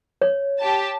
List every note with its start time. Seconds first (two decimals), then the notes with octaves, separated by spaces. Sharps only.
0.22 C#5
0.60 G4 A5